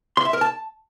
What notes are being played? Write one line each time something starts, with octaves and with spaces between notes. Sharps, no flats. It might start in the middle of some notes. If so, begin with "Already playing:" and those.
C6
E5
A#4
A5